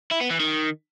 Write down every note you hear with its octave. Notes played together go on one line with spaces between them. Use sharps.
E4
B3
E3
D#3